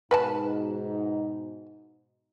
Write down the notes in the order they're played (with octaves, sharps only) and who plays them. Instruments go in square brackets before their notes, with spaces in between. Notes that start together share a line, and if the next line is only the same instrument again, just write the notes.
[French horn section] G#2 B2 D#4 [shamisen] B4 G#5 A5